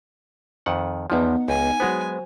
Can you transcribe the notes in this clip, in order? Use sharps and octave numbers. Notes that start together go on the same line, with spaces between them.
F2 D#3 F#5
E2 F3 B3 D#4 F#5
C#2 G#5
F#3 G#3 B3 F#4 C5